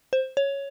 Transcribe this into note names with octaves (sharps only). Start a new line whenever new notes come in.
C5
C#5